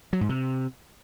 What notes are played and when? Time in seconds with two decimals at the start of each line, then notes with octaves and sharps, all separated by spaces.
0.13 F#3
0.21 G#2
0.29 C3